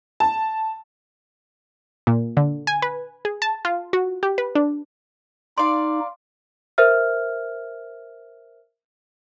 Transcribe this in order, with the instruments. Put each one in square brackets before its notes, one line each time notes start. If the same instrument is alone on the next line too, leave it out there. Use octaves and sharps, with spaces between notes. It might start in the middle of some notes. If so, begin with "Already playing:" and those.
[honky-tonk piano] A5
[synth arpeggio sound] A#2
D3
G#5
B4
G#4
A5
F4
F#4
G4
B4
D4
[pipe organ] D#4 [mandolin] D5 F5 [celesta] C6
[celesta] A#4 C5 E5 F6